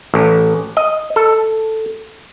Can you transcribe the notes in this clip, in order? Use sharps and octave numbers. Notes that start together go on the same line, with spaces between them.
A1
D#5
A4